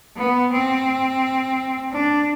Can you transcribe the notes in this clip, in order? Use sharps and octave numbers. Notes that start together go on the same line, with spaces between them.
B3
C4
D4